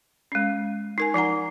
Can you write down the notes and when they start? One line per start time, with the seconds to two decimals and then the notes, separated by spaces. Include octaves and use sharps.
0.32 G#3 C#4
0.98 D#4 A#4 G#5
1.14 F3 D#4 F#5 A#5